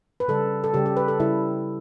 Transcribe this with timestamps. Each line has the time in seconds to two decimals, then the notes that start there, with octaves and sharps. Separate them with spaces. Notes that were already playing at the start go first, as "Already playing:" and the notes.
0.20 B4
0.28 C#3 G3 A4
0.64 A4
0.74 C#3 G3 G4
0.86 G4
0.97 B4
1.08 A4
1.20 C#3 G3 E4